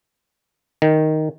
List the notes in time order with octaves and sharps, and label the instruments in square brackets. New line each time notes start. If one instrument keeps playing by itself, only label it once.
[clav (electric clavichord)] D#3